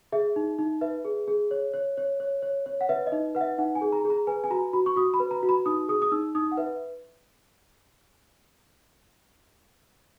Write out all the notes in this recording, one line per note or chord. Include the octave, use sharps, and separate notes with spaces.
G#4 E5
D#4
D#4
B4 E5
G#4
G#4
C#5
C#5
C#5
C#5
C#5
C#5
F#5
B4 E5
D#5
D#4
B4 F#5
E5
D#4 F#5
G#5
G#4
A#5
G#4
A#5
B4 G#5
G#5
F#4 A#5
F#4 B5
C#6
F#4 D#6
B5
B4
A#5
F#4
B5
D#4 D#6
G#4 D#6
D#6
D#4 E6
D#4 D#6
F#5
B4 E5